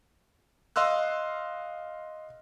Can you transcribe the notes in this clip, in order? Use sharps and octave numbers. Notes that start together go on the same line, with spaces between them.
D#5 F5 C6 E6 F#6